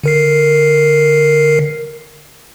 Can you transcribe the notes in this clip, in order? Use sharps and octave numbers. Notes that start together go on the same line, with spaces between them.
D3 A#4 C7